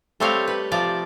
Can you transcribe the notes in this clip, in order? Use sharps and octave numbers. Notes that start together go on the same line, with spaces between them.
G3 A3 C4 G4 C#5 F5
B4
C3 F3 D5